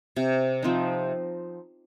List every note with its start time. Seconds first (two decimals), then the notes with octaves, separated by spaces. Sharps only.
0.16 C3
0.63 F3 C4 D#4